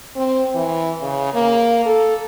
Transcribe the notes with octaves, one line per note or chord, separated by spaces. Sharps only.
C4
E3
C#3
A#3
A4